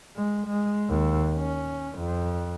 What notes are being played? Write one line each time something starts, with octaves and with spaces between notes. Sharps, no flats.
G#3
G#3
D#2
C#4
F2